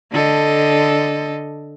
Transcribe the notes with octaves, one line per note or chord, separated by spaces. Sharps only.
D3 A4 D#5